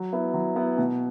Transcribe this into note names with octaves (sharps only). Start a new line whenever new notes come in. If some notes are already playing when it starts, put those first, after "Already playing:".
Already playing: F#3
B3 E4
F#3
B3 E4
B2